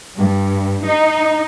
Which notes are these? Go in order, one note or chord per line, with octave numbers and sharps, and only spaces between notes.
G2
D#4